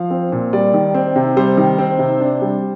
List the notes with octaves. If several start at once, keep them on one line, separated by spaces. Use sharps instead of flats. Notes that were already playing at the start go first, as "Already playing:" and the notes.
Already playing: F3 F5
C4
A#2
G3 D5
D#3
C4
C3
G3 C5
D#3
C4
C3
D4
G3